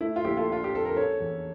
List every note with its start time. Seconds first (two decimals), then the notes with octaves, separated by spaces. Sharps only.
0.01 A3 E4
0.16 F4
0.25 A#1 E4 G4
0.37 F4 A4
0.49 D4 F4
0.64 G4
0.73 F2 A4
0.85 A#4
0.97 C#4 A4 C#5
1.20 E2